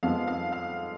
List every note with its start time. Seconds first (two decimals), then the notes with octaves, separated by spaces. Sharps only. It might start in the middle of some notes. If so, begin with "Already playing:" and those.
0.03 F2 F3 G#3 B3 F5
0.28 F5
0.52 F5